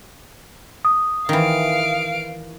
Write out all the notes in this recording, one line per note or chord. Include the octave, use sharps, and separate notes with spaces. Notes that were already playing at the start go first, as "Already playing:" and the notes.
D#6
D#3 E3 F5 D7